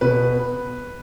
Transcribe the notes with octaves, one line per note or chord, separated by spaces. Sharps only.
B2 B4